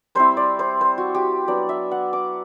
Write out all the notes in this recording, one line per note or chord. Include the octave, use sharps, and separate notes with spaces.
G3 C4 E4 C5
D5
C5
C5
F#4
G4
F#3 B3 D4 D5
E5
F#5
D6